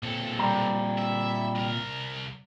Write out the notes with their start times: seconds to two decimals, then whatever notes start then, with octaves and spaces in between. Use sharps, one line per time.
0.03 B1 A#2 C4 A4
0.39 G3 A#5
0.98 E5
1.55 C2 A#4